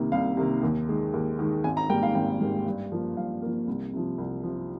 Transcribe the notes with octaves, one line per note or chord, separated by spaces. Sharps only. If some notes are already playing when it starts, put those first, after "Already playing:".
Already playing: C2 C3 D#3 A#3
C2 F5
C3 D#3 A#3
D#2
D#3 G#3
D#2
D#3 G#3
G#1 G#5
A#5
G#2 G3 A#3 G5
F5
G#1 G5
G#2 G3 A#3
G2
F3 A#3
G2 F5
F3 A#3
C2
C3 F3
C2
C3 F3